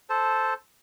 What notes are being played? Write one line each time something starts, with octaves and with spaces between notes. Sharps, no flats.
A4 C5 A5